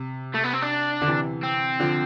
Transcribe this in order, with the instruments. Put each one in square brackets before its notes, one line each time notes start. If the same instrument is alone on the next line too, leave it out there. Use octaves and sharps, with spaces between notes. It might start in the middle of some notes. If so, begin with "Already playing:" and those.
Already playing: [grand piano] C3
[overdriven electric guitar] A3
B3
C4
D4
[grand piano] D3
C3 E3
[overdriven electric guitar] C4
[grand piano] D3 F3